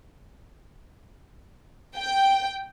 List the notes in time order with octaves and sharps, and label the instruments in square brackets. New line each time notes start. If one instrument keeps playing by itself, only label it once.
[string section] G5